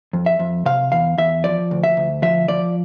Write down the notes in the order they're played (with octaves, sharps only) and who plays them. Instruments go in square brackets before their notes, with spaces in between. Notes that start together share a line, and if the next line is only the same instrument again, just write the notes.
[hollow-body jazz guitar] F2
E5
F2
C3 F5
E2 F5
E2 E5
F3 D5
D2
E5
D2
F3 E5
F3 D5